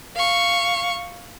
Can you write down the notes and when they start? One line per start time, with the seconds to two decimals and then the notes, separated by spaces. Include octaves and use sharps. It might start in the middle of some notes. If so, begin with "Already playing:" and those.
0.16 F5 C#6